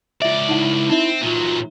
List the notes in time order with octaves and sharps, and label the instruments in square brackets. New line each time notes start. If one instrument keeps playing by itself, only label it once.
[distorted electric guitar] C#2 D5 [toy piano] F4 E5
[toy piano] D#4 F#5 [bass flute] E4
[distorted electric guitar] C4 [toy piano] D#4 E5
[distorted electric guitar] A#2 F#3 [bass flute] F4